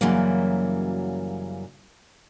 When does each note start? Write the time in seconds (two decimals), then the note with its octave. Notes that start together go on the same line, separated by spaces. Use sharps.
0.01 F#2 C#3 E3 F#3 G3 A#3